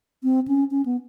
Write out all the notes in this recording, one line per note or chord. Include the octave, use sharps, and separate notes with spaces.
C4
C#4
C#4
B3